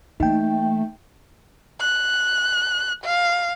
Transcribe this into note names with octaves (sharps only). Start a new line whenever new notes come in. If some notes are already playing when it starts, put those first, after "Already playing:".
E3 A3 A#3 D#4 G5
F#6
F5